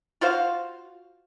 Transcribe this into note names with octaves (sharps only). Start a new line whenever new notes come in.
F4 F#4 C5 F5